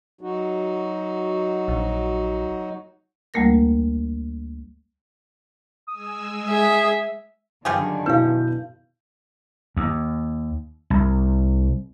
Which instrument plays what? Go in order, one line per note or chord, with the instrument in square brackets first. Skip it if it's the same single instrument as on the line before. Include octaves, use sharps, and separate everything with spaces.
[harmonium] F#3 D#4 F#4
[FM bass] A#1
[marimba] D2 G3 A3 A#3 A#4 A#6
[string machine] G#3 G#5 E6 [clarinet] D#6
[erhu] G#4 [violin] E5
[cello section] F#2 D3 D#3 [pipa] G3 F4 G#4
[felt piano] B2 E4 G6 [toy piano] B4 F5
[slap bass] D#2
C2